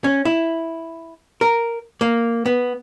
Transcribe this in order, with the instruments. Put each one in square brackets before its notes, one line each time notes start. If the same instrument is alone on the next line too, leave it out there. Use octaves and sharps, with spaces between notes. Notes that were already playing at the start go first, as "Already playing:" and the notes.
[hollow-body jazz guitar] C#4
E4
A#4
A#3
B3